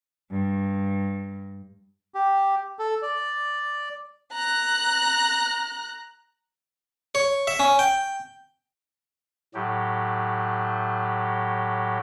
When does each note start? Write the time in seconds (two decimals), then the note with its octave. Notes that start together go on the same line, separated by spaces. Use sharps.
0.30 G2
2.14 G4
2.79 A4
3.02 D5
4.32 A#5 F#6
7.15 C#5
7.47 E5
7.59 C#4
7.79 G5
9.54 A2 F#3 G4